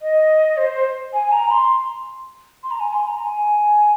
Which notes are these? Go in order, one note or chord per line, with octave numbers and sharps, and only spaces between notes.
D#5
C5
G#5
A#5
C6
C6
A#5
G#5
C6
A#5
G#5